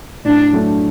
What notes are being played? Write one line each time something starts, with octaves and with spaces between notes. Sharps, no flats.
A2 D4
F#3 A3 D4